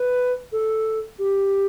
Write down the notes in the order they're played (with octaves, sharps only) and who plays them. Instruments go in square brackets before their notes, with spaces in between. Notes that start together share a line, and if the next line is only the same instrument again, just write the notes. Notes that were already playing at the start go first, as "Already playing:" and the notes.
Already playing: [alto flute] B4
A4
G4